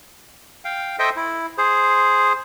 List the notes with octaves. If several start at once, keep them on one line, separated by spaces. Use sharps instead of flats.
F5 G5
A4 C5 D#5 E5 G5
E4
G#4 C5